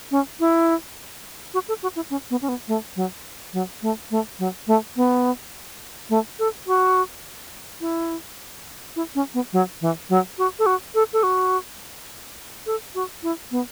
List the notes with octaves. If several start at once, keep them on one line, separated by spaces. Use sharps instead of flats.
C#4
E4
F#4
A4
F#4
E4
C#4
B3
C#4
B3
A3
F#3
F#3
A3
A3
F#3
A3
B3
A3
A4
F#4
E4
E4
C#4
B3
F#3
E3
F#3
F#4
A4
F#4
A4
A4
F#4
A4
F#4
E4
B3